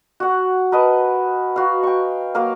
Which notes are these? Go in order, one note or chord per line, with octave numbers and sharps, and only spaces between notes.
F#4 F#5
A#4 B4 D#5 A5
F#4 F5
G5 C#6
F#3 A#3 A#4 F5